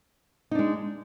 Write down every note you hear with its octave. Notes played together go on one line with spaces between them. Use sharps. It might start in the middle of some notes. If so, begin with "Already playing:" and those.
G#3 D4 D#4